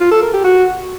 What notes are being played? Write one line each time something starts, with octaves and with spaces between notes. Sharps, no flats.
F4
A4
A#4
G4
F#4